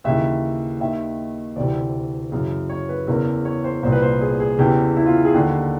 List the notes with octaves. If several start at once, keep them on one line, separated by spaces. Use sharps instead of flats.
D#2 C#3 E3 E5
D#2 D#3 E5
D2 C3 E3 D5
F#2 C#3 E3
C#5
B4
E2 C#3 E3 A#4
C#5
C5
C2 A#2 C5
B4
C5
G#4
G#4
E2 C#3 E3 G4
E4
F4
G#4
D#2 D3